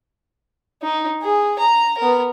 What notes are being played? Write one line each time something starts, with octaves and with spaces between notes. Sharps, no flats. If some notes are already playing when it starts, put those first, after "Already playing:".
D#4
G#4
A#5
B3 A#4